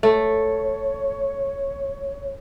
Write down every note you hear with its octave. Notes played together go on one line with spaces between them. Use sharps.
A3 C#5